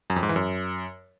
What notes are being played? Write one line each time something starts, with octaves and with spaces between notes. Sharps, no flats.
F#2
F2
G#2
E3
F#2